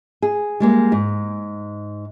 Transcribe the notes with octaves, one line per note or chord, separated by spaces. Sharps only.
G#4
G3 G#3 A#3
G#2